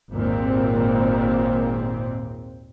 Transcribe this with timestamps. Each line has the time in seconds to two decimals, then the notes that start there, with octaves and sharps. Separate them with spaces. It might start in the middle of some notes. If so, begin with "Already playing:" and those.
0.13 G#1 D#2 A#2 C4